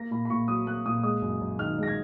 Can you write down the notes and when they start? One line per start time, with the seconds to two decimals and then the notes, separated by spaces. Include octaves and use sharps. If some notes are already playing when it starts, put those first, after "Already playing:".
Already playing: A#3 A#6
0.11 A#2 B5
0.25 B5
0.30 A#2 C#6
0.48 F#3 D#6
0.66 A#3 F#6
0.86 A#2 D#6
1.03 G#3 D#6
1.22 F#2
1.41 F#2
1.59 D#3 F6
1.78 G#3 A#6
1.88 G#6